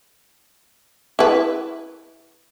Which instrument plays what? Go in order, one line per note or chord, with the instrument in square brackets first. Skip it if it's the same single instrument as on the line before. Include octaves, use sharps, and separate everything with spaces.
[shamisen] E4 B4